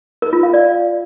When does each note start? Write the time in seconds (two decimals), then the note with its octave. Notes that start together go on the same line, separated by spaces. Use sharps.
0.22 A#4
0.33 F4
0.43 F5
0.54 D5